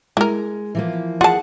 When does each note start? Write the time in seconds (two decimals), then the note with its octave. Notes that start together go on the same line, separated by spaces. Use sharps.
0.17 G#3 E4 A#4
0.75 E3 F3 A#3
1.21 F4 G#4 F#5 A5